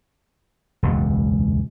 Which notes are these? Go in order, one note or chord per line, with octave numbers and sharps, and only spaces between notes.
E1 C#2 F#2